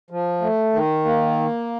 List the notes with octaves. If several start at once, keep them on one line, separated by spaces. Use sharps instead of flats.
F3
A3
D#3
A#3